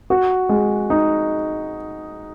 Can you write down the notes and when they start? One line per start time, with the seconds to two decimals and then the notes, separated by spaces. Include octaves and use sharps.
0.10 F#4
0.49 G#3
0.90 D#4